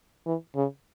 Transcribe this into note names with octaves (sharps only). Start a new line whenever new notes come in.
E3
C#3